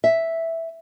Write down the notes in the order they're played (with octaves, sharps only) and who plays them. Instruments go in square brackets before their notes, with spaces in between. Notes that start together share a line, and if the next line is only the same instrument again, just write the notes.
[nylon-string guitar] E5